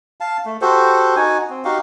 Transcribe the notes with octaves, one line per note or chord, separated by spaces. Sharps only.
F5 A5
A3
F#4 G4 A4 C5
D#4 F#4 G#5
C4
D#4 F#4 G4 F5